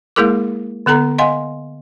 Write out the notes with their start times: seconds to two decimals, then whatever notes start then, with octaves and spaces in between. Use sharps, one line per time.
0.16 G#3 A#3 E4 G#4 A#4 D6
0.86 D3 B3 A4 A#5
1.18 D#5 F5 F#5 G#5 C6